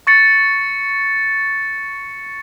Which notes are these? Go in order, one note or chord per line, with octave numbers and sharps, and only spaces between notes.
C#6 A6 C#7